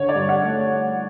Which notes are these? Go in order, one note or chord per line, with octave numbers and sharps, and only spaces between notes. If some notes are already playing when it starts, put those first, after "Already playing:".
Already playing: D3 C#5
D5
G2
F#5
A3